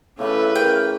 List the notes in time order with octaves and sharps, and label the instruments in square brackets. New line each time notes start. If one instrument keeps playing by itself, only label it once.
[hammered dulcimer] A2 C#3 E3 [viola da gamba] C#4 B4 [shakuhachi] A4
[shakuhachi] A#4 [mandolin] G5 [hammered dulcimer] C6